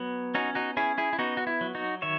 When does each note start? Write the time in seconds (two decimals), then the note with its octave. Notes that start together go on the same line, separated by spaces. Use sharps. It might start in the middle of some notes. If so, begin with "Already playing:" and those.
Already playing: F#3 B3
0.35 C#4 D#4 F#4
0.55 D#4 F#4
0.77 C#4 E4 G#4
0.98 E4 G#4
1.13 E4
1.19 B3 D#4 F#4
1.37 F#4
1.47 E4
1.61 F#3
1.75 D#4 F#4
2.02 D#3 C#5 E5